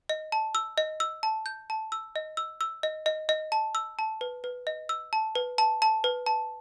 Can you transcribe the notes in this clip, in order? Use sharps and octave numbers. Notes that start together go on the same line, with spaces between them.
D#5
A5
E6
D#5
E6
A5
G6
A5
E6
D#5
E6
E6
D#5
D#5
D#5
A5
E6
A5
B4
B4
D#5
E6
A5
B4
A5
A5
B4
A5